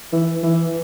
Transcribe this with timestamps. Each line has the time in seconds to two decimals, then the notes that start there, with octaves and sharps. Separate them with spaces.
0.13 E3
0.43 E3